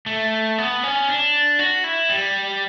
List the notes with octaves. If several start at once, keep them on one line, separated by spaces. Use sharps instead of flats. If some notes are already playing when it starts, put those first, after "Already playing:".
A3
B3
C#4
D4
F#4
E4
G3